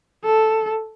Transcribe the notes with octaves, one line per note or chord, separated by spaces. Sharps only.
A4